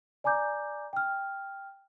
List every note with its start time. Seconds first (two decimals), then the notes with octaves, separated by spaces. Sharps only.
0.24 D5 G#5 A#5 D6 G6
0.93 G5 F6